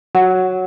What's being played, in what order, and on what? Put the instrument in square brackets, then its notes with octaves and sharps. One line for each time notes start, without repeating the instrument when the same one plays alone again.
[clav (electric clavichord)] F#3 [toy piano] F#5